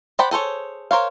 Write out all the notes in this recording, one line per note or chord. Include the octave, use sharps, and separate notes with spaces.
C5 D5 F#5 G5 B5
G#4 A4 C5 C#5
A#4 C5 C#5 F5